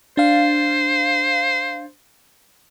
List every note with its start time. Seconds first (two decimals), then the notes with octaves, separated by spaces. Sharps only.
0.17 D4 C5 F5